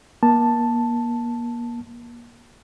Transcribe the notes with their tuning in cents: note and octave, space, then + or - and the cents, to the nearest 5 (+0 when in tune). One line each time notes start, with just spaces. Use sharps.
A#3 +35 A5 +5